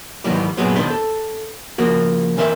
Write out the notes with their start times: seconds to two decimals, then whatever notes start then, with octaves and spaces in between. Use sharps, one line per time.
0.24 G#2 D#3 E3 F#3 G3
0.57 F#2 A#2 F#3 G#3 B3 C4
0.76 B2 D#3 D4 C5 B5
0.90 A4
1.78 C#3 F3 A#3 F#4
2.37 E3 C4 A#4 C5 E5